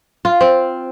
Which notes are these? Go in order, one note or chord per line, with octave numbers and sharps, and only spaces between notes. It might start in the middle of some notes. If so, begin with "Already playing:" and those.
F4
C4